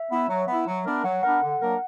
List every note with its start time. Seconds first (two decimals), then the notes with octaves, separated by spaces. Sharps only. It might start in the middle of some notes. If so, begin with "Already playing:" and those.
Already playing: E5
0.10 B3 E4
0.29 F#3
0.48 B3 E4
0.67 F#3
0.86 B3 D4 A#4
1.04 F#3 F#5
1.23 B3 D4 A#4 F#5
1.42 D3
1.61 F#3 A#3 D4 A#4